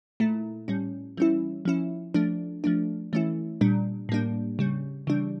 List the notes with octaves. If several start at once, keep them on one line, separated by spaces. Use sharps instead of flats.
A#2 A3 E4
A2 G3 C#4
E3 G3 C#4 E4
F3 C#4 E4
F3 A3 D4
F3 A3 D4
E3 A3 C#4 E4
A#2 G3 D4
A2 G3 A#3 D4
C#3 G3 C#4
C#3 E3 G3 D4